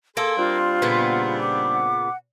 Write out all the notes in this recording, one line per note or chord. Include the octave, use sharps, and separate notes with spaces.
A#3 G#4 A4 C6
G3 C4 D4 F4
A#2 C#3 B3
D6
F#5